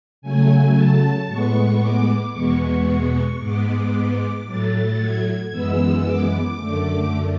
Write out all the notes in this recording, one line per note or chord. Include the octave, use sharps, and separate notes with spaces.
C#3 F#3 A3 G#5
A5
A2 G#3 B3 C#6
D6
E2 B2 G#3 B3 C#6
G#2 G#3 B3 D6
A2 F#3 A3 A6
G#6
F#2 E3 G#3 B3 E6
D6
F#2 D3 A3